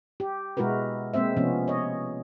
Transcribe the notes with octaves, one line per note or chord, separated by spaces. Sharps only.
G4
B2 G#3 E4 F#4 A#4 B4
G#3 A#3 C4 C5 E5
C3 F3 B3 C#4
C#5 D#5